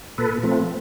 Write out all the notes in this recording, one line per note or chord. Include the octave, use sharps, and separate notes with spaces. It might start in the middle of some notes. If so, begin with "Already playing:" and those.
A#2 A4 B4
F3 A3 C4